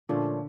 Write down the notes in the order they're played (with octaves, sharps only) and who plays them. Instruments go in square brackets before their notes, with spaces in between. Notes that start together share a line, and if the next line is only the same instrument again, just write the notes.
[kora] A#2 F3 A3 C#4 [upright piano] D3